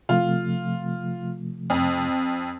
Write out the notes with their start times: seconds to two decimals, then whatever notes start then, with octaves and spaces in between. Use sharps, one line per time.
0.09 C3 F3 A3 F4
1.70 F2